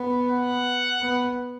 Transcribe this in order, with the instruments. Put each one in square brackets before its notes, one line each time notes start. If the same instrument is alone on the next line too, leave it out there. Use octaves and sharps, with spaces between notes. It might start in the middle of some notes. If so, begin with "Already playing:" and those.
Already playing: [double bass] B3
[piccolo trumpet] F#5
[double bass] B3